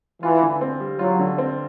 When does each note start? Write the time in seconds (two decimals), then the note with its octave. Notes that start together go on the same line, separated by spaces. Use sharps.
0.22 E3 F4
0.42 D3
0.61 C4
0.80 G3
0.99 F#3 F4
1.19 D3
1.38 C4